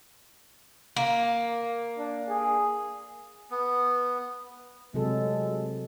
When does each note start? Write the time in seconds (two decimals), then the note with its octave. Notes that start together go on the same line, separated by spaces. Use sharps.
0.96 A#3
1.98 D4
2.29 G#4
3.51 B3
4.94 C3 F#3 G#3 A4